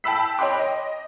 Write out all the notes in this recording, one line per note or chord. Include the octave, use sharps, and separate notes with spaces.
G5 A5 B5 E6 B6
C#5 D#5 G5 B5 C6 D6
D#5